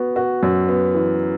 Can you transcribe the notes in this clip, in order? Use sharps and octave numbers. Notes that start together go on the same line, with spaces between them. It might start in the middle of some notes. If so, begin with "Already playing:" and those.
Already playing: B3 F#4
F#4
F#2
B3
E3